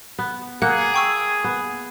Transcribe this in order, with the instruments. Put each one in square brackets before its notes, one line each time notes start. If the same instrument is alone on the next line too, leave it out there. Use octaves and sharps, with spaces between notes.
[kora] B3
[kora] A#3 [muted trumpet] G#4 [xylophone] F#5 F#6
[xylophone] G5 C#6 E6
[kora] B3